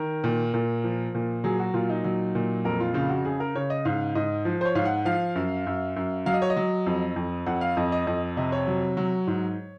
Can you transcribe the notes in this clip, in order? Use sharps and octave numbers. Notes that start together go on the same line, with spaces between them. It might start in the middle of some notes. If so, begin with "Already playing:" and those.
Already playing: D#3 A#4
A#2
A#2
F3
A#2
F#3 G#4
F#4
A#2 F4
D#4
F#3
A#2
F2 A#4
F4
C#3 F4
F#4
C#3 G#4
A#4
C#3 C#5
D#5
G#2 F5
G#2 D#5
F3
C5
C#5
G#2 F5
F#5
F3 F5
F#2
F#2
F#2
F#3 F5
D#5
C#5
D#5
F#3
F2
F2
F2 F#5
F5
F2 D#5
D#5
F2 D#5
C3 D#5
C#5
F#3
F#3
G#2